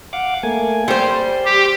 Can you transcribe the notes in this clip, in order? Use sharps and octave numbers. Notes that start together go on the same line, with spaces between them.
F5 F#5 D6
A3 A#3 G#5
G3 C5 C6
G4